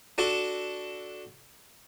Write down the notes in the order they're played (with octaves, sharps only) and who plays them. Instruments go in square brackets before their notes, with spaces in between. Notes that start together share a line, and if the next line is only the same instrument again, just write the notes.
[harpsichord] D4 F#4 A4